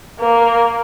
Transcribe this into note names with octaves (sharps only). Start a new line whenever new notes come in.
A#3